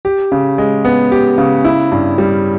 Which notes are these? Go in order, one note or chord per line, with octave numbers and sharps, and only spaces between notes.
G4
C#3
G#3
B3
G4
C#3
E4
G2
G3